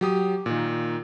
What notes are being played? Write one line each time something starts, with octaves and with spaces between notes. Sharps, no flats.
F#3 G4 D#6
A#2 D#3